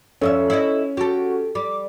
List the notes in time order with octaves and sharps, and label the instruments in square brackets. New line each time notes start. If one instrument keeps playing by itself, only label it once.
[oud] F2 D#5 E5 [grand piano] C#4 [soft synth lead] A4
[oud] E4 C#5 D#5
[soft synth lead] F#4 [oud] G4 A4
[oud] G3 [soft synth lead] D6